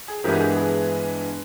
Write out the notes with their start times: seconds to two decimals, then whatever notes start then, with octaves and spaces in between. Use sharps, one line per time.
0.08 G#4
0.24 G2 E3 G#3 B3 G4 A#4
0.35 G4
0.40 G#4
0.57 G#4